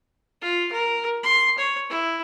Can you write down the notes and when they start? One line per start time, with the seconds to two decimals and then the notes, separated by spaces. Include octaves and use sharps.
0.42 F4
0.72 A#4
1.23 C6
1.58 C#5
1.90 E4